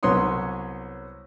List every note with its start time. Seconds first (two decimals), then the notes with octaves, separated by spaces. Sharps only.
0.03 C2 F#3 B3 C#5 C6 D#6